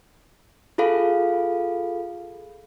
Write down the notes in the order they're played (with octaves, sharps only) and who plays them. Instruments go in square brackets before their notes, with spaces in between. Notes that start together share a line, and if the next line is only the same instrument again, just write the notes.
[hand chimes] F4 G#4 A4 F5 B5